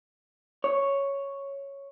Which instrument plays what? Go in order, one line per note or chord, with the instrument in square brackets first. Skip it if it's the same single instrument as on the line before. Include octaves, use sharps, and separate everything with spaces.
[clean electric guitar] C#5